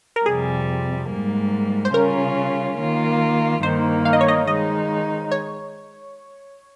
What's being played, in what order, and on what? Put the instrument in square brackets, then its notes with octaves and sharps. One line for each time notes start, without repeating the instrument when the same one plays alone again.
[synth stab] A#4
[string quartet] F2 C3 G3 [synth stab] G#4
[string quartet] G#2 G3 A#3
[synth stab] C5
[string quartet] C#3 G3 C#4 F4 [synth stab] A#4
[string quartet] D#3 A#3 F4
[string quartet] G2 D#3 A#3 D#4 [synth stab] C5
[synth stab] F5
D#5
C#5
D#5
[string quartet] D#3 G#3 D#4 [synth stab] D#5
[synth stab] C#5